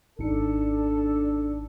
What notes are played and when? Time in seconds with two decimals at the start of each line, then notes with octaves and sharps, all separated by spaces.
0.19 G#1 D4 D#4 A4 C#7